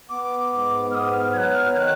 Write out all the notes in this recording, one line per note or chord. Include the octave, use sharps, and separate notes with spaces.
B3 D6
G#2
B3 D#6 F6
F6
F#3 G#6
F#6
F6
D#3 F#6 G#6